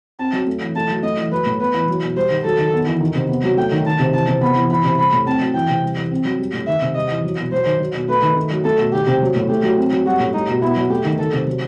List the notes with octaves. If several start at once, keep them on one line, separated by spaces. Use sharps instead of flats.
C4 A5
F#3
A3
E3
A3 A5
F#3
A3 D#5
E3
F#3 B4
A2
B3 B4
E3
F#3
B2
G3 C5
D#3
F#3 A4
D#3
B3
E3
D#3
C3
B3
F#3
A3 G5
D#3
D#3 A5
C3
E3 A5
C3
B3 B5
E3
E3 B5
C3
G3 B5
A2
C4 A5
F#3
E3 G5
C3
G3
E3
C4
F#3
G3
A2
D#3 E5
C3
G3 D#5
E3
F#3
B2
F#3 C5
D#3
F#3
B2
A3 B4
D#3
A3
F#3
A3 A4
B2
D#3 G4
C3
F#3
A2
A3 G4
F#3
C4
F#3
G3 F#4
A2
G3 D#4
B2
B3 E4
F#3
A3 G4
D#3
D#3 A4
C3
F#3